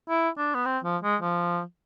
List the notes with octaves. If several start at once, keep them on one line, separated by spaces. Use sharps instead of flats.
E4
D4
B3
C4
F3
G#3
F3